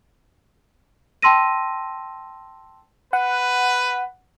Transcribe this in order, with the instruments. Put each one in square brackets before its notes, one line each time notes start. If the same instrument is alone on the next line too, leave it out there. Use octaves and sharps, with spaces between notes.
[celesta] G5 A5 C6 E6 A#6 D#7
[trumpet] B4 [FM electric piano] F#5